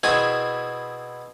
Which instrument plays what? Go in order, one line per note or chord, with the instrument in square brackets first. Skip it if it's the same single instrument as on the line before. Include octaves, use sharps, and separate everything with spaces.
[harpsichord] B2 C4 E4 G#4